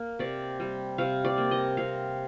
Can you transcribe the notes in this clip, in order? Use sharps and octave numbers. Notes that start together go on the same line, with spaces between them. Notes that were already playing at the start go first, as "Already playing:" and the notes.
Already playing: A#3
C3 D5
G3
C3 F5
D5
A#3
D#5
C3 F5